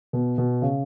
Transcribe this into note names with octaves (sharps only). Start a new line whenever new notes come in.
B2
B2
C#3